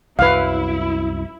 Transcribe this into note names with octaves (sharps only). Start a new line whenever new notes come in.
C2 F#2 F#3 E4 B4 F5